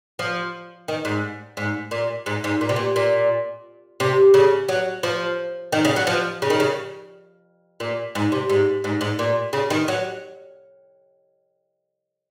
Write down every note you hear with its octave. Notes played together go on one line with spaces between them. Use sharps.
F3
D#3
G#2
G#2
A#2
G#2
G#2
A#2
C3
A#2
A#2
C3
C#3
F#3
F3
D#3
C#3
F#3
F3
C#3
D#3
C#3
A#2
G#2
C3
G#2
G#2
G#2
A#2
C#3
D#3
F#3